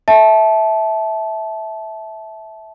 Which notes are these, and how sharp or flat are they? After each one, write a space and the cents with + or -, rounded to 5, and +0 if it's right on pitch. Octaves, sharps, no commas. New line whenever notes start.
E5 -15 A5 -20